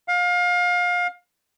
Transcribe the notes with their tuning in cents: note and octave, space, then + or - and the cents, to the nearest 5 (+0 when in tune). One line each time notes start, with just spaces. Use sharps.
F5 +30